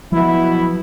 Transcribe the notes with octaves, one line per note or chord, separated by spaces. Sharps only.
B2 F3 F#3 B3 E4